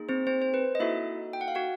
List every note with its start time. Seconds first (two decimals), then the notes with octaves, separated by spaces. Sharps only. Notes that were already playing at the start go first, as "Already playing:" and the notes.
Already playing: A#3 D#4 G#4
0.09 C4 C5
0.27 C4 C5
0.42 C5
0.54 B4
0.75 D#5
0.80 A#3 D#4 E4 F#4 A4 E5
1.33 G5
1.41 F#5
1.48 F5
1.55 F#4 F#5